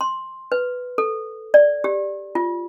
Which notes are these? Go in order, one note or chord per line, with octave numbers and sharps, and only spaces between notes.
C6
B4
A4
D5
G4
F4